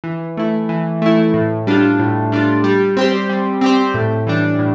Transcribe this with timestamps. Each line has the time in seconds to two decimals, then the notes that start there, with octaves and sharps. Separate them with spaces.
0.04 E3
0.37 A3 E4
0.69 E3
1.02 A3 E4
1.34 A2
1.67 G3 D4 F4
1.99 A2
2.32 G3 D4 F4
2.64 G3
2.97 C4 G4 C5
3.30 G3
3.61 C4 G4 C5
3.94 A2
4.27 E3 G3 D4
4.59 A2